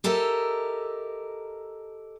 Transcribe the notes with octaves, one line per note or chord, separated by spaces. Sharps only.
G4 A4 A#4 D#5 E5